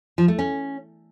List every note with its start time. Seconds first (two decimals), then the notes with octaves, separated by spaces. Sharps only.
0.18 F3
0.28 A3
0.39 C#4